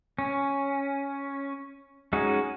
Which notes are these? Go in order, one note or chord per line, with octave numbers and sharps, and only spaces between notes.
C#4
G#3 C#4 D#4 F#4